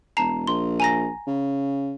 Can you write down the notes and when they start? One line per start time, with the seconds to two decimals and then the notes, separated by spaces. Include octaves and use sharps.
0.17 E1 A5 A#5 C7
0.47 A#1 C6
0.80 G#5 A#5 A#6
1.27 C#3